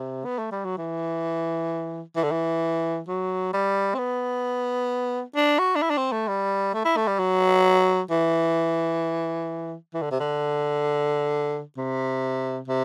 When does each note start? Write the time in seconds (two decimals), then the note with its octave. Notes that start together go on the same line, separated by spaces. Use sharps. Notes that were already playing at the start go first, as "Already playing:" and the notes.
Already playing: C3
0.25 B3
0.38 A3
0.51 G3
0.64 F#3
0.78 E3
2.16 E3
2.23 D3
2.31 E3
3.07 F#3
3.53 G3
3.94 C4
3.98 B3
5.36 D4
5.59 F#4
5.76 D4
5.82 E4
5.90 D4
5.97 C4
6.12 A3
6.28 G3
6.74 A3
6.85 E4
6.96 A3
7.07 G3
7.19 F#3
8.10 E3
9.94 E3
10.02 D3
10.11 C3
10.20 D3
11.77 C3
12.68 C3